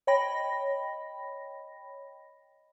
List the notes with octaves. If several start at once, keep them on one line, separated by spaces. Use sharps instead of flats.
C#5 D#5 G5 B5 A#6